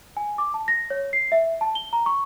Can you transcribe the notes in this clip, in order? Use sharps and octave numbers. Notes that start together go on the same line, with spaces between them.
G#5
D6
A5
A#6
C#5
C7
E5
A5
G7
A#5
C#6